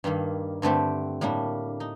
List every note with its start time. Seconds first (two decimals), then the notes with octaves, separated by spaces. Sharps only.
0.04 G2 D#3 G3 A#3
0.62 G2 D3 A3 C4 G4
1.21 A2 G3 A#3 D4
1.80 D#4